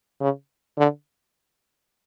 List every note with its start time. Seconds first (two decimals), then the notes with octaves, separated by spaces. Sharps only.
0.21 C#3
0.78 D3